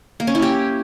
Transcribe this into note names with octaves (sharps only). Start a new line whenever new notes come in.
A#3
C#4
E4
G4